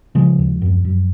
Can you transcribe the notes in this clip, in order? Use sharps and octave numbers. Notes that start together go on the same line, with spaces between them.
C#3 F3 G#3
D#2
F#2
F#2